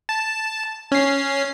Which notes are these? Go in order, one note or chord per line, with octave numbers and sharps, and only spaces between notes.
A5
C#4 C7